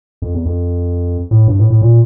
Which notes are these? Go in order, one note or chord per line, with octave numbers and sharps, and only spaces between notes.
F2
E2
F2
A2
G2
A2
A2
A#2